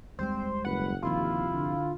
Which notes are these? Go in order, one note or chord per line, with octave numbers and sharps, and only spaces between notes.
D#2 G3 G#3 C4 C5
F#1 B4 F#5
G1 D#2 C3 F3 E4 F4
D3